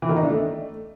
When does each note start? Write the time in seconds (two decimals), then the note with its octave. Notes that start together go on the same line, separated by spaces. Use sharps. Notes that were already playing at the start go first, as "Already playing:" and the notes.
0.02 E3
0.09 D#3
0.16 D#4
0.23 D4
0.30 A3